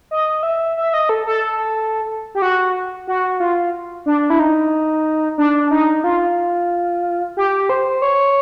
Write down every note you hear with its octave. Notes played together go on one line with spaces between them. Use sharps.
D#5
E5
E5
D#5
A4
A4
G4
F#4
F#4
F4
D4
E4
D#4
D4
D#4
F4
G4
C5
C#5